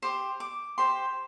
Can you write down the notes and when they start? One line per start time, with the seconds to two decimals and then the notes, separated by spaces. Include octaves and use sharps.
0.02 G4 C5 C6
0.40 D6
0.78 G4 C5 C6